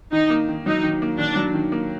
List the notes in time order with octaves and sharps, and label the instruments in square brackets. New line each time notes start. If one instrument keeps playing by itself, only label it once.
[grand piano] D#3 [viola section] D#4
[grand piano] A#3
D#3
[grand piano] F#3 [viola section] D#4
[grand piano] D#3
A#3
[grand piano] D#3 [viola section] D4
[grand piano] F#3
D#3
A#3